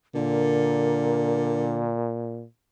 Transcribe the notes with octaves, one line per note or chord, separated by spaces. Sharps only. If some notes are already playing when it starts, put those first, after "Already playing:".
A#2 D3 A#4